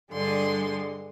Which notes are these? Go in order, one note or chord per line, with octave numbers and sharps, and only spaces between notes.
G2 D3 G#3 C6